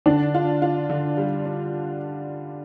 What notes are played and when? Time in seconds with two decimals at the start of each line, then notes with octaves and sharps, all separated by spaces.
0.06 D3 D4
0.34 F4
0.62 F4
0.90 D3
1.17 G3
1.45 D4